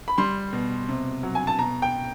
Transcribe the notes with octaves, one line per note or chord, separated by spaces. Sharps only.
B5
G3 C6
B2
C3
F#3
G#5
A5
B2 A#5
G5